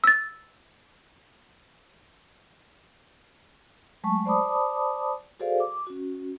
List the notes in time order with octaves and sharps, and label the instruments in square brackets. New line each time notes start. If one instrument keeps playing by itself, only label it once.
[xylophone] E6 A6
[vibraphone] F#3 G#3 A3 A5 C#6
C5 D5 A5 B5 D6 D#6
F#4 G#4 A4 C5 D5 F5
D6
C#4 F#4